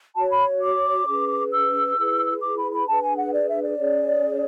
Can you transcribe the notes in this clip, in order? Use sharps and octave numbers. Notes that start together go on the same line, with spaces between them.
F#4 C#5 A5
B5
D6
C#4 G#4 B4
E6
E4 G#4 B4
D6
B5
B5
D4 G#4 B4 A5
G#5
F#5
D5
E5
D5
C#4 G#4 C#5